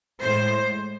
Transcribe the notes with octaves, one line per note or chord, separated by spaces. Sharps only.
A2 G#3 C5